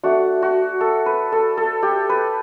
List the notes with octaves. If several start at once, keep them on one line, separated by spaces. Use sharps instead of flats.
A3 D4 F#4
F#4
A4
B4
A4
A4
G4
B4